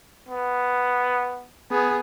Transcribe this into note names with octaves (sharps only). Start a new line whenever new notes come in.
B3
B3 G#4